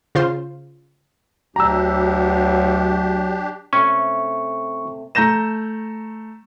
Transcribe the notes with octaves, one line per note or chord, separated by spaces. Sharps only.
C#3 F4 C5 C6
D2 F#3 D4 G4 A#5 E6
C3 A3 C#4 C#6
A3 A#5 G6 A#6 E7